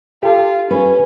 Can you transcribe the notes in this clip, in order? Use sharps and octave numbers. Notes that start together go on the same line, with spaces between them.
F4 G4 A4
C#4 B4